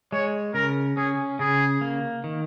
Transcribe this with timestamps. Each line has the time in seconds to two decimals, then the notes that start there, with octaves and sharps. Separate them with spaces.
0.12 G#3 C#5
0.54 C#3 A#4
0.97 C#4 G#4
1.39 C#3 G#4
1.81 A#3
2.24 D#3